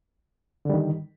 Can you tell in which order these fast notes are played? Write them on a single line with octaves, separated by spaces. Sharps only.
D3 G3 D#3